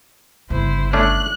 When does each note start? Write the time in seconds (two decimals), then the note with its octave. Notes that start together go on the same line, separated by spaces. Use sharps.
0.50 G1 C#3 E4 C5
0.93 A3 C#4 D4 F#6